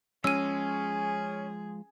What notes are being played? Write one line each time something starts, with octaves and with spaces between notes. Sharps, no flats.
F3 G#3 C#4 G#4 E6 D#7